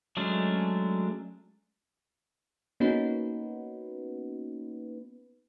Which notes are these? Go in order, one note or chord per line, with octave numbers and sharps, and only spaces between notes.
F#3 G#3 A3 C#4 D4
A#3 B3 C#4 D#4 F#4 B4